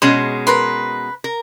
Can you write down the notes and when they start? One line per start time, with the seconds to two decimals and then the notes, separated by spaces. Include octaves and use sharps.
0.02 B2 G#3 C#4 C6
0.47 A#4 B4 C6
1.24 A#4